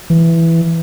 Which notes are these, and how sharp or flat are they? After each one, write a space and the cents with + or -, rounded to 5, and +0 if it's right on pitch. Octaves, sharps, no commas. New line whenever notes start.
E3 +5